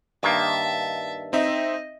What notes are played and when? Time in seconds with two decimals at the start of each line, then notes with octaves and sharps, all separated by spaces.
0.23 G2 D#3 A#3 E5 A5
1.33 C4 D#4 D#5 E5